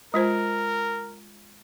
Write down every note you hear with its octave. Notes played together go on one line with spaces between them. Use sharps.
G#3 F4 A#4 C5